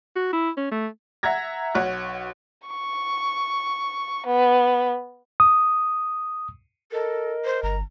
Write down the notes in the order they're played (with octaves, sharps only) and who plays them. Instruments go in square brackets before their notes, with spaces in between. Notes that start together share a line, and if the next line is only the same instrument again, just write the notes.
[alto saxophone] F#4
E4
C#4
A3
[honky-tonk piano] E5 F#5 A#5 G#6 A#6
B1 C#5 F#5 F#6
[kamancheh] C#6
B3
[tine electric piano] D#6
[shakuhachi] A4 [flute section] A#4 D#5
[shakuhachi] C5
[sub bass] G1 [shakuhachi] A#5